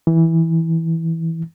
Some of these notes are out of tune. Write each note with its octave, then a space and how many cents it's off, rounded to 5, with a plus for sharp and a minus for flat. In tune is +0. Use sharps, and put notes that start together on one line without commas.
E3 -10